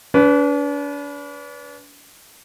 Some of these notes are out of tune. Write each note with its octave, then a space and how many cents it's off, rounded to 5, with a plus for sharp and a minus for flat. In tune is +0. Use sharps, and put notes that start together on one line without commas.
D4 -40 B4 +0